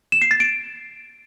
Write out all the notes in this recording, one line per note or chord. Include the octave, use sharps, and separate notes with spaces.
E7
C7
A6
D7